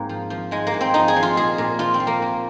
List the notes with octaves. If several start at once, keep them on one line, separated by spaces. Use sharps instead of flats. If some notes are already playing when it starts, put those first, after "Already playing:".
Already playing: G#2 A#3 C4
F3
F3
G#2 G#3
A#3
G#2
C4
F3 D#4
G#4
F3
F4
A#2 G#4
A#2
F3 F4
C4
F3
A#3
A#2